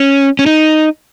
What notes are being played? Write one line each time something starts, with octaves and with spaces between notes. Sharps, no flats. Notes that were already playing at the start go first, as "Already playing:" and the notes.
Already playing: C#4
C#4
D#4